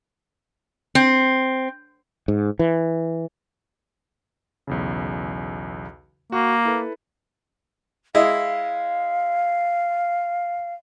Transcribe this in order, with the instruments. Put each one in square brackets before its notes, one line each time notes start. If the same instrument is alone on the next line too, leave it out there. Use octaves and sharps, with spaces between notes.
[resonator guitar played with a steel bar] C4
[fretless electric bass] G#2
E3
[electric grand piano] B1 E2 C#3
[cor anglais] A#3 [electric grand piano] F#4
[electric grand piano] E4 A4 B4
[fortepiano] G#3 E4 D#5 [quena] F5